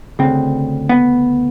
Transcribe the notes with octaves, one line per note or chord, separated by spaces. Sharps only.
D2 C#3 C4
B3